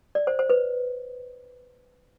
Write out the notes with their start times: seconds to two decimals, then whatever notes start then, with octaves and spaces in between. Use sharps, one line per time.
0.15 D5
0.27 C5
0.39 C5
0.50 B4